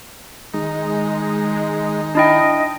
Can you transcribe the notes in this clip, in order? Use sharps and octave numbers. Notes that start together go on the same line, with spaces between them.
D#3 G#3 D#4
D4 E4 D#5 G5